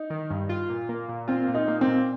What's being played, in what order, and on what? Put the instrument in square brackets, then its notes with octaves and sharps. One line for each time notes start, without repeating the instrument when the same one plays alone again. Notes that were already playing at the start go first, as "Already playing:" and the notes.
Already playing: [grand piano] D#4
[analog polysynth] D#3
G2
F4
A#2
A#3
A#2
[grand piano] C4 [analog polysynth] F4
[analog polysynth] A#2
[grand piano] D#4
[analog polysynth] A#3
[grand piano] C4
[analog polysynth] A#2